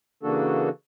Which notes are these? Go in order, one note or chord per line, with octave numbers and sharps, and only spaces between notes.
C#3 E3 A#3 D4 F#4 A4